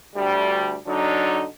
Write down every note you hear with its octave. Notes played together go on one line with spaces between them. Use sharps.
D2 G3
D3 F#3 D4 D#4